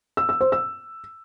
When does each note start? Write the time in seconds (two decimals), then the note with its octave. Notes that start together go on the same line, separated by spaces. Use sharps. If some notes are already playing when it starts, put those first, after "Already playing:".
0.17 E6
0.29 E6
0.41 C5
0.52 E6